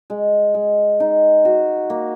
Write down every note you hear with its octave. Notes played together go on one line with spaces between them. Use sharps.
G#3
G#3
D#4
F#4
A#3